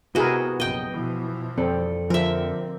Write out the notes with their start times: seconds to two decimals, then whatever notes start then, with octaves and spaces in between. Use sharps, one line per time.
0.15 C3 B3 E4 F#4 G#4 A#4 D#5
0.60 A#1 F#2 C3 D#5 G5
0.91 B2 E3 F3
1.58 F2 C4 A4 D5
2.10 D3 F3 C4 A#4 E5